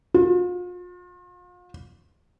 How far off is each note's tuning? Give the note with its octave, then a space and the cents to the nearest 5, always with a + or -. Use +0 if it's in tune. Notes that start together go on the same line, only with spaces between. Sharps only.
F4 +40